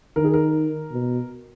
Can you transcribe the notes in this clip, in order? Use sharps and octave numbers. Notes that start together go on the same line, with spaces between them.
D#3 A#4
G#4
A#4
B2